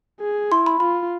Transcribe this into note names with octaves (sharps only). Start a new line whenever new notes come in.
G#4
E4 C6
B5
F4 B5